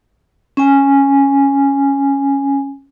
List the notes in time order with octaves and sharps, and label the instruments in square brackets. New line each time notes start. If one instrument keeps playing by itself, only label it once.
[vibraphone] C#4 G#5